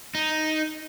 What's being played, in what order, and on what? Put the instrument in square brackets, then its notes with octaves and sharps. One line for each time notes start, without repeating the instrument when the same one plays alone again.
[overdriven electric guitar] D#4